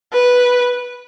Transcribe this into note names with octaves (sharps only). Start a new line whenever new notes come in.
B4